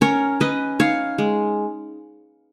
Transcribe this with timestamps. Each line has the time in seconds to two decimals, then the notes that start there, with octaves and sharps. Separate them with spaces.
0.01 C#4 A#4 C#5
0.40 C#4 B4 D#5
0.79 D#4 C#5 F5
1.18 G#3